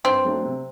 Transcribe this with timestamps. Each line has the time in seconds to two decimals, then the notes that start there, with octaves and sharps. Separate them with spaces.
0.04 G2 C4
0.24 F#3 A3 D4
0.42 C3